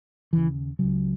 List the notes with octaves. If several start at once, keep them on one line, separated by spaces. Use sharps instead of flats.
D#2 C#3 E3
C#2 C#3 F#3